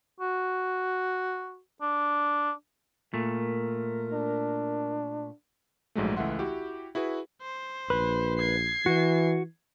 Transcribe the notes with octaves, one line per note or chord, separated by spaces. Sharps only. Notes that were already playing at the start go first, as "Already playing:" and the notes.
F#4
D4
A#2 A3 A#4
D4
A#1 G#2 F#3 G#3 A3
C#2 E3 A3 E5 F#5 C6
E4 F#4 G4
E4 F#4 G#4 B4
C5
A#1 B4
G#6 C7
E3 F#4